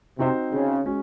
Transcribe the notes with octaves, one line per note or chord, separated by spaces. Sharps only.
C3 C4 D#4 F#4 C5
C#3
G#3 C#4 F#4